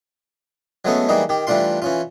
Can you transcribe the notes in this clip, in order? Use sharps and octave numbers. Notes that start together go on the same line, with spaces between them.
F#3 G#3 A3 B3 C#4 A4
E3 G3 G#3 A#3 D#4
D#3 G4
E3 G3 A3 D4 F4 C6
E3 C#4 F4